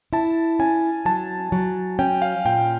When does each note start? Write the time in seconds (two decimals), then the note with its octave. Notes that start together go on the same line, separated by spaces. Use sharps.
0.13 E4 A5
0.59 C#4 G#5
1.05 F#3 A5
1.52 F#3
1.99 C#4 G5
2.22 F5
2.45 A#2 G5